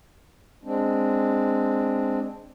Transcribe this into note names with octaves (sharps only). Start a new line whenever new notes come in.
G#3 C4 D4